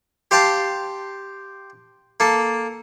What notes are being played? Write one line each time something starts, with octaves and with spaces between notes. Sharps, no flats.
G4 C5 F5 G5 A5
A#3 A4